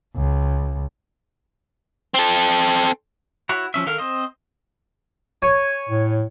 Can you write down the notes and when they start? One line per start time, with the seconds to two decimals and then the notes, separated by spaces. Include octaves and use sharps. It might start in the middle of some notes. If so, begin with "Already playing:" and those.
0.16 C#2
2.14 C4 A4
3.49 E4 F#4 C#5
3.74 F3 C#4 E5
3.86 D#3 A4 A#4 F5 F6
3.98 C4 C5 D#5
5.42 C#5 G#5 C#6
5.89 A2